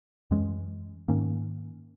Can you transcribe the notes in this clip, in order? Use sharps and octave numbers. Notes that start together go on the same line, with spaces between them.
F#2 E3 G#3 C#4
G#2 D#3 A#3 C#4